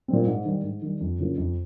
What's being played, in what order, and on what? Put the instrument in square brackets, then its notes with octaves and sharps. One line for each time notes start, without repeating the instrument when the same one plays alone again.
[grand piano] A#2 G3 C4
G#2
D#3 G3
G#2
D#3 G3
F2
C#3 F3 A#3
F2